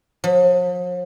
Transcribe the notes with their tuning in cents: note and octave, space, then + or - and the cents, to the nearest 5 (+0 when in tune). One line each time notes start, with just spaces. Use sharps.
F3 +45